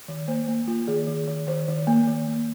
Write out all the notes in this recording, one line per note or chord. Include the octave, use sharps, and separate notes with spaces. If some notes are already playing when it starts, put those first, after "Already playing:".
D#3
A#3 C5
A#3
A#3 F4
D#3 G#4
D#3
D#3
D#3 C5
D#3
A#3
D#3
A#3